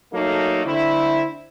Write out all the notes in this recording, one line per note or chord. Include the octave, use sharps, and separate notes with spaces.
F#3 A3 A#3 D#4 A4
D3 A3 C4 E4